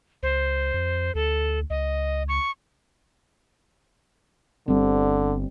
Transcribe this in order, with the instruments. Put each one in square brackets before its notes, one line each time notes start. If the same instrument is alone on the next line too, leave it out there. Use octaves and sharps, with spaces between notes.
[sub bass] C#2 [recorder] C5
[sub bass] F2
[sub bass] D2 [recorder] A4
[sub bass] C#2 [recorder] D#5
[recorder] C#6
[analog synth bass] G1 [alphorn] D3 [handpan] G3 C4